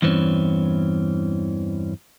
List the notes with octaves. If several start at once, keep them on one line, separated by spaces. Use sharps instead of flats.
E2 G2 E3 C4 C#4